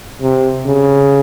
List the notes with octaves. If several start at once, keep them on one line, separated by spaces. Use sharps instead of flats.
C3
C#3